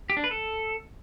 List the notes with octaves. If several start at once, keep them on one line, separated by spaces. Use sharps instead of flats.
G4
D4
B4
A4